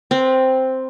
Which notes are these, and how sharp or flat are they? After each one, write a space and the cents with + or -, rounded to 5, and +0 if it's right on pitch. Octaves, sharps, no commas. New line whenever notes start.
C4 +0 B4 -40